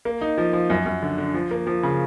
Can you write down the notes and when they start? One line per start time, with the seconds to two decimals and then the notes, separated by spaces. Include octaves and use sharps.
0.05 A#3
0.21 D#4
0.38 F3
0.53 F3
0.70 F#2
0.86 F#2
1.02 D3
1.18 D3
1.34 F3
1.51 A#3
1.67 F3
1.83 C#3